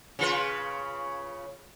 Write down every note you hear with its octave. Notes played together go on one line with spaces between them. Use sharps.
C#3 F4 B4